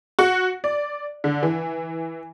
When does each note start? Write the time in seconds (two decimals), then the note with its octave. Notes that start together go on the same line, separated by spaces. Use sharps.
0.19 F#4
0.64 D5
1.24 D3
1.43 E3